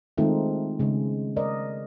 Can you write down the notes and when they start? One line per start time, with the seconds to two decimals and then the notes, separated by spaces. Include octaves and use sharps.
0.18 D#3 G#3 A3 C4 D#4 F4
0.79 C#3 G#3
1.37 A#4 D5 D#5